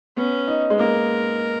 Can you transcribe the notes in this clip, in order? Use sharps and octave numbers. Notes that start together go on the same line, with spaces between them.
B3 C#4
D#4
G#3
A#3 A#4